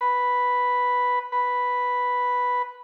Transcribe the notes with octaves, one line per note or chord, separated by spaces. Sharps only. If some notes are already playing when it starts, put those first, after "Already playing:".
B4
B4